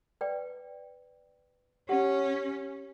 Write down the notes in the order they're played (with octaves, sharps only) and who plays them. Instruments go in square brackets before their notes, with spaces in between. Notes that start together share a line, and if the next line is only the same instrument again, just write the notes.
[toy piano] B4 D5 G5
[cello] C#4 [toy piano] G4 F#5